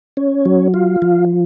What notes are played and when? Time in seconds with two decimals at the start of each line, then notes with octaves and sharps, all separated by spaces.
0.17 C#4
0.45 F#3
0.74 F4
1.02 F3